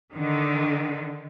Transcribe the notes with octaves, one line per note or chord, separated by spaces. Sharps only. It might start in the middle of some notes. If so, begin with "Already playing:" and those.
D3 D#3